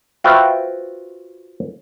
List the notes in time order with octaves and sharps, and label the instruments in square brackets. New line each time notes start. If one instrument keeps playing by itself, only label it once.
[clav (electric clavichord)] F4 F#4 B4 C5 E5 G5